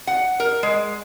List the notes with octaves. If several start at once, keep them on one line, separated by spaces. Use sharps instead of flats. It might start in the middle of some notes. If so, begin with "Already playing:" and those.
F#5
A#4
G#3